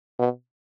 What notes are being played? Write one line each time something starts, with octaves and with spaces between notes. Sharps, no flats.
B2